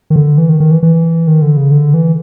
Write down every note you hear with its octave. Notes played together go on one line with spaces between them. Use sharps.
D#3
D3
E3
D#3
D#3
E3
E3
D#3
D3
C#3
D3
E3